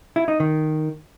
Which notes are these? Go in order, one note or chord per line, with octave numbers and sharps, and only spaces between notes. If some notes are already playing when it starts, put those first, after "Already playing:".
E4
D#4
D#3